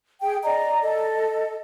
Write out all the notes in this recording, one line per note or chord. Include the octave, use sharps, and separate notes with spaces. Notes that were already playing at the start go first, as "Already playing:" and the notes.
G#4 G5
D5 D#5 A#5
A4 D#5